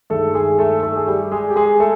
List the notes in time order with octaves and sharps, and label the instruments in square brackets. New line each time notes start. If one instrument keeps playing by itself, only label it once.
[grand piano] G2 D#3 G#3 A3 A4
G#3 G#4
A3 A4
A3 A4
G#4
G3 G4
G#3 G#4
G4
G#3 G#4
A3 A4